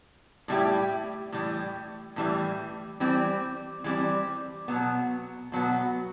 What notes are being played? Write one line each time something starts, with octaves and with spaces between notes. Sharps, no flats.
A2 G3 C4 E4 G4
A2 E3 G3
A2 E3 G3
E3 G3 C4
E3 G3 C4
B2 F#3 B3
B2 F#3 B3